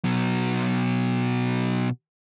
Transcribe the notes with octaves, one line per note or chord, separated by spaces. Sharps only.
B2 F#3